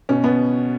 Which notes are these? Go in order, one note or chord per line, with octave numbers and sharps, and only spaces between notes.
B2 C#4
B2 B3